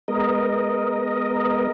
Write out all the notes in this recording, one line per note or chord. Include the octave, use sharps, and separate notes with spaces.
G#3 B3 A#4 D#5